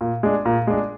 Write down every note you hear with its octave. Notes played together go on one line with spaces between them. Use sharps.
A#2
G#3 D4
A#2
G#3 D4